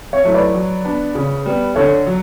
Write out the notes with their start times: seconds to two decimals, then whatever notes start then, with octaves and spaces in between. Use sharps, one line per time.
0.13 C#5 E5
0.24 F#3 A3 E4
0.34 B4 D5
0.54 F#3
0.85 B3 D4
1.15 C#3
1.46 G3 B3
1.76 D3 A4 C#5
2.06 F#3